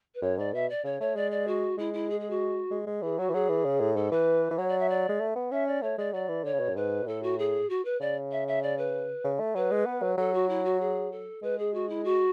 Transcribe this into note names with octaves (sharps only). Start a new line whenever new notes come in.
B4
F#2 C#5
G#2 D5
B2 E5
D5
C#3 C#5
A3 C#5
G#3 D5
D5
F#4
G#3 E4
E4
G#4
G#4
F#4
G#3
G#3
E3 G#4
F#3 F#4
E3
F#3 G#4
E3
C#3
A2
G#2 A4
E3 B4
E3
F#3 C#5
D5
E5
D5
G#3
A3
B3
C#4 E5
D5
A3 C#5
G#3 D5
F#3 D5
E3
D3 C#5
C#3
B2
F#2
G#2 B4
B2
A2 A4
F#4
G#4
F#4
B4
C#3 D5
E5
E5
D5
B4
C#3
A3
F#3 B4
G#3
B3
F#3
F#3 A4
F#4
E4
F#4
G#4
A4
G#3 B4
G#4
F#4
E4
F#4